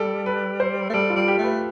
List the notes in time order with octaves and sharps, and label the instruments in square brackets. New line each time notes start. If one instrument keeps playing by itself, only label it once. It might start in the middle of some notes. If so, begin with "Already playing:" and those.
Already playing: [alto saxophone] G3 [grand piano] A4
[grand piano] B4
C5
[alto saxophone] A3
[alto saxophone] G3 [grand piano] A4
[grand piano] F4
[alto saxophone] G3
[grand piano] G4
[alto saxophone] A3
[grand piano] B4